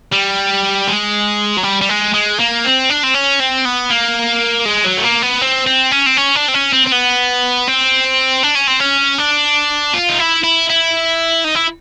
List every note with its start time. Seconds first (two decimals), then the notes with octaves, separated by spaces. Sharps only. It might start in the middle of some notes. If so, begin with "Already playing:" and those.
0.13 G3
0.88 G#3
1.58 F#3
1.64 G3
1.82 G3
1.89 G#3
2.14 G#3
2.39 A#3
2.65 C4
2.90 D4
3.03 C4
3.14 C#4
3.40 C4
3.65 B3
3.90 A#3
4.65 G#3
4.84 F#3
4.97 A3
5.03 A#3
5.22 B3
5.41 C4
5.67 C4
5.91 C#4
6.06 C4
6.17 C#4
6.36 D4
6.48 C4
6.54 C#4
6.73 C4
6.87 C4
6.92 B3
7.67 C4
8.43 D4
8.55 C#4
8.68 C4
8.80 C#4
9.18 D4
9.94 F4
10.09 D#4
10.19 E4
10.44 E4
10.70 E4
11.44 D#4
11.55 E4